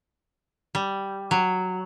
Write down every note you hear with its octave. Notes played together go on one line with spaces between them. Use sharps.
G3
F#3